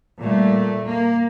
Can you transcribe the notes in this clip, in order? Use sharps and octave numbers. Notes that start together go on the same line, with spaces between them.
A#2 G3 A3
A#3